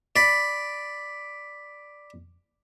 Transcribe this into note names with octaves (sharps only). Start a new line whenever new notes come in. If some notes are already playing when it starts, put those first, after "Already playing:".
D5 B5